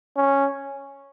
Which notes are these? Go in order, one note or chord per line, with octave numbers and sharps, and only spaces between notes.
C#4